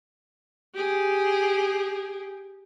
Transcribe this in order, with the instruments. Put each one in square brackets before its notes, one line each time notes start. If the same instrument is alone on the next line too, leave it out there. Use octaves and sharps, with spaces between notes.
[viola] G4 G#4